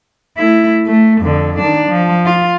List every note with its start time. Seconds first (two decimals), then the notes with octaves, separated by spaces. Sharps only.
0.37 A3 E4
0.86 A3
1.22 F2 D3
1.59 D#3 D4
1.89 F3
2.26 F4